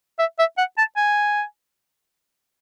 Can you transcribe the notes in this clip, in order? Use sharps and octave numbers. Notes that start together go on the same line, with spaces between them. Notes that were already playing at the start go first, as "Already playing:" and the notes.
E5
E5
F#5
A5
G#5